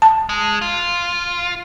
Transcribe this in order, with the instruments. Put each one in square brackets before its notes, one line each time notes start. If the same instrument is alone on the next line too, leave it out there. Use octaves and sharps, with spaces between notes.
[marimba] A5
[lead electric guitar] G#3
F4